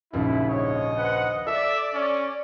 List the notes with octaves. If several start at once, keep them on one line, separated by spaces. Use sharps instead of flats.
A#1 D#2 C#3 E4
G#2 C#5 D#5
B4 C5 F#5
A4 D5 E5
C#4